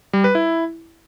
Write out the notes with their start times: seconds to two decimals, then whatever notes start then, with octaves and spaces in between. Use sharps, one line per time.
0.13 G3
0.24 B4
0.35 E4